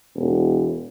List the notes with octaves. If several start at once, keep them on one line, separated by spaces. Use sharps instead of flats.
E1